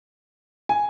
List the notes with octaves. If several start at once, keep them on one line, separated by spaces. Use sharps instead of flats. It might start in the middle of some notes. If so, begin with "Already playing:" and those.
G#5